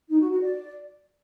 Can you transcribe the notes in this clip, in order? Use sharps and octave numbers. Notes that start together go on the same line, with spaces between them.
D#4
F#4
F#4
D5